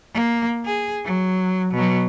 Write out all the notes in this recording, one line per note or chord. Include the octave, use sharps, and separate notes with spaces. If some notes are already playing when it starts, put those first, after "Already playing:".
A#3
G#4
F#3
B2 F#3